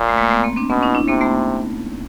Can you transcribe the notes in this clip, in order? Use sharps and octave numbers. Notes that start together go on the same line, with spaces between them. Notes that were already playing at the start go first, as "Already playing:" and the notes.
Already playing: A#2
A3
G#3 A#3
A3 B3
A#3 C4
C4 D4
B2 B3 C#4
C#4 D#4
D4 E4
C3 A#3 C4
A3 B3